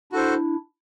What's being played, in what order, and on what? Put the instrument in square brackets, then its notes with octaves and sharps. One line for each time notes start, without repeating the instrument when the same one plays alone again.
[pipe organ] D4 E4 [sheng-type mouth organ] F#4 A4 C5